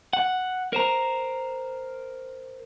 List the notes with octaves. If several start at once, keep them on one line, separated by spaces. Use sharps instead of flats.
F#5
A#4 C5 A#5